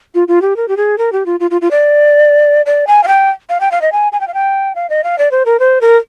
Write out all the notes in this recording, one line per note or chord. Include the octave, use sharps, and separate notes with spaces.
F4
F4
G4
A#4
G4
G#4
A#4
G4
F4
F4
F4
F4
D5
D5
G#5
F5
G5
F5
G5
F5
D#5
G#5
G#5
G5
F5
G5
F5
D#5
F5
D5
C5
A#4
C5
A#4